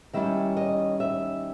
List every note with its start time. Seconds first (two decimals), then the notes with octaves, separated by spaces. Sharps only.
0.13 D#3 G3 C#4 E4 E5
0.57 D#5
1.00 E5